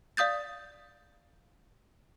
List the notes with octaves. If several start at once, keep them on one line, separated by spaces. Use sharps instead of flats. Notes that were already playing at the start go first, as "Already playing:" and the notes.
D5 F5 D#6 G6 A6